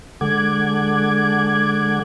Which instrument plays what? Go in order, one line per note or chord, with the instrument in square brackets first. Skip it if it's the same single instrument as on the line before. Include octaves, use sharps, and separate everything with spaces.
[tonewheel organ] D3 G#3 A4 F#5 D6 G#6